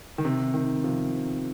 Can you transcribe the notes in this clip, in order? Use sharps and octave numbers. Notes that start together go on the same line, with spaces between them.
D#3
C3
D#3
C3 F3